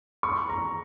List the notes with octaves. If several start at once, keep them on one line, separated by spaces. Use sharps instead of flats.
C#6
A#5